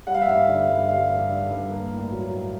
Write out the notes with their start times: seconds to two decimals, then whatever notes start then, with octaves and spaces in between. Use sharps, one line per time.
0.07 G3 F#5
0.14 F5
0.21 E5
0.28 G2 F5
0.48 D3
0.69 G2
0.89 G3 F5
1.10 G2
1.30 D3
1.50 G2
1.70 A#3
1.91 A2
2.12 F#3
2.32 A2